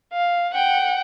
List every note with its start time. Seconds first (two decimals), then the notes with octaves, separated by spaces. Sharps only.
0.13 F5
0.54 F#5 G5